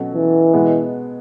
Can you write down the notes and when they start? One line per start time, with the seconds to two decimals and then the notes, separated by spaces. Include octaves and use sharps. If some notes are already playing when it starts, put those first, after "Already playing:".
Already playing: B2 F#3 C#4 A4
0.14 E3
0.53 B2 G#3 B3